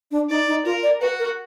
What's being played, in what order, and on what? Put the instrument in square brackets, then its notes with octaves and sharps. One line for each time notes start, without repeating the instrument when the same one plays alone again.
[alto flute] D4
[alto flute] D#4 [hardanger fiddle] D5
[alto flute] D#4
[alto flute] F4 [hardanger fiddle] A#4
[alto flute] D5
[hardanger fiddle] F#4 [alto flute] B4
[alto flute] A#4